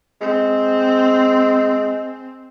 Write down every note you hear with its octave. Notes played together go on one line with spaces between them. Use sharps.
G#3 C4